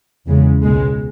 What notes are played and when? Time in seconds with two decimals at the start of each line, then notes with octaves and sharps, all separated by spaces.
0.26 E2 C#3 G#3
0.64 C#2 B2 G#3